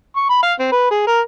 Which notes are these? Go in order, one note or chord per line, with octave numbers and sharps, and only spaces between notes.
C#6
B5
F5
C4
B4
G#4
A#4